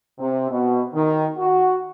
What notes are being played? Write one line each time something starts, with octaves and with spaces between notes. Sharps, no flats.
C3
B2
D#3
F#4